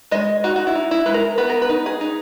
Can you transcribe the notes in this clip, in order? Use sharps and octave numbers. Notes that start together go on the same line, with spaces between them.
G#3 D#5
D#4 F#4
F#4
E4
D#4
E4
G#3 B4
A#4
B3 B4
A#4
B4
D#4
G#4
D#4